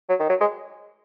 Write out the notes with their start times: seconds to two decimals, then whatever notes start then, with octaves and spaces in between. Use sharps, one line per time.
0.09 F#3
0.20 D#3
0.30 F#3
0.41 G#3